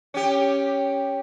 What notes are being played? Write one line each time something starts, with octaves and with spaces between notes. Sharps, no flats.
C#4 G4